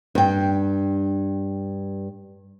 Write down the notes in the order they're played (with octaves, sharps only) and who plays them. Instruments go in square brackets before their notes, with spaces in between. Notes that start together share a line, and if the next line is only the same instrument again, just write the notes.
[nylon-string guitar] G2 G5